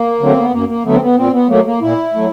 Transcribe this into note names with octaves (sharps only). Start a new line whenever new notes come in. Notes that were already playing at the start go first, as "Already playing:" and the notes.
Already playing: A#3
D3 F#3 A3 C4
B3
F#2 A#3
A#3
D3 F#3 A3 B3
C4
B3
A#2 C4
B3
F#3 A3 A#3
A#3
A#2 E4
F#3 A3